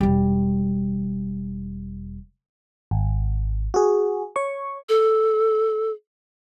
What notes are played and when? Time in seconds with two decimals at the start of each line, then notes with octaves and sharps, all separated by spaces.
0.01 E1 G3
2.91 G#1
3.74 F#4 G#4
4.36 C#5 C#6
4.89 A4